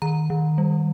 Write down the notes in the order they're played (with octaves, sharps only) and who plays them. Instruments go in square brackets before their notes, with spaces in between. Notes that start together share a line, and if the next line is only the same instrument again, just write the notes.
[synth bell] D#3 A#5
D#3
G3